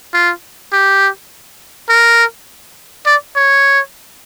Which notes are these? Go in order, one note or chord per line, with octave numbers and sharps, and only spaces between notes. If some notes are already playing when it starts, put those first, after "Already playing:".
F4
G4
A#4
D5
C#5